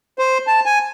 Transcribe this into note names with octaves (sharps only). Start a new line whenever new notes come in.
C5
A5
G#5